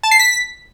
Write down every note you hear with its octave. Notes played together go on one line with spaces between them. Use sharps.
A5
C7
B6